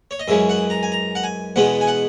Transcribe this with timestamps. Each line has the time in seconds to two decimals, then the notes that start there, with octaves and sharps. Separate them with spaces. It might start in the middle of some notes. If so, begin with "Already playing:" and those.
0.11 C#5
0.19 D#5
0.28 F#2 C#3 E3 G#3 E5
0.49 F#5
0.70 A#5
0.83 G#5
0.92 A#5
1.15 F#5
1.24 G#5
1.56 E2 B2 G#3 B3 F#5
1.81 G#5
1.87 F#5